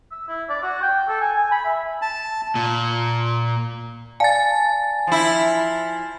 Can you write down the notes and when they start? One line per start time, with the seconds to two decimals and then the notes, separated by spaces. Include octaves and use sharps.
0.11 E6
0.28 E4
0.49 D5
0.63 F#4
0.82 G5
1.08 A4
1.21 G#5
1.36 G#5
1.52 B5
1.65 E5
2.02 A5
2.55 A#2
4.20 D5 F5 G#5 A5 A6
5.07 F3 E4